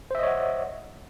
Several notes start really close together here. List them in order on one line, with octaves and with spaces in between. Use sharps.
C5 E5 D#5 C#5 F#5